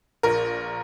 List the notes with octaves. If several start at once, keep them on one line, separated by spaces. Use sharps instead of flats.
A#1 A#4